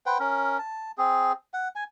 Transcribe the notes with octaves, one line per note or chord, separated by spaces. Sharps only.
B4 C5 F#5 G5
C#4 A#4
A5
C4 G#4
F#5
G#5